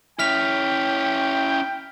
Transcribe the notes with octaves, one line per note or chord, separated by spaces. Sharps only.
C#4 E4 G5 F6 B6 F7